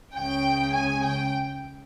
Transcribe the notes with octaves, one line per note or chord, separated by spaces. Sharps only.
C#2 C#3 G5
G#5
G5